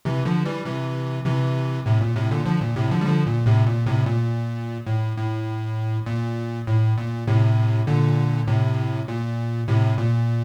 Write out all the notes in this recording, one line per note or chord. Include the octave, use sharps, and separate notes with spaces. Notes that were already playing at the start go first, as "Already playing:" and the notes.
C3 E3
D3 F3
E3 G3
C3 E3
C3 E3
A2 C3
A#2
A2 C3
A#2 D3
D3 F3
A#2
A2 C3
D3 F3
G3
D3 F3
A#2
A2 C3
A#2
A2 C3
A#2
A2
A2
A#2
A2
A#2
A2 C3
A#2 D3
A2 C3
A#2
A2 C3
A#2